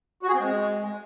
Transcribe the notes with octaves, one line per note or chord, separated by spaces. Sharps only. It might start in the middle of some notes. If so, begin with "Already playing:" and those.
F#4
G#4
C4
G#3